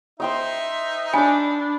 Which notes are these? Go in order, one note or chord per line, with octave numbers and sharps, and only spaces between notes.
D#4 C5 E5 G5 D#6
D4 G#5 B5 D6